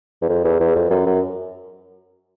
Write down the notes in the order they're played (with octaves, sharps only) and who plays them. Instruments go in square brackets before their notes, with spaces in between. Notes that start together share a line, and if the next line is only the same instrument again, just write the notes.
[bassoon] E2
F2
E2
E2
F2
F#2
F#2